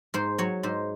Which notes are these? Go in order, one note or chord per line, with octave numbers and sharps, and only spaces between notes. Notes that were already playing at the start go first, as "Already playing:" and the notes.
G#2 C5
F#3 C#5
G#2 C5